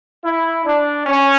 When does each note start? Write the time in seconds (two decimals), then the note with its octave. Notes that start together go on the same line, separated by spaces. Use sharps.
0.24 E4
0.65 D4
1.07 C#4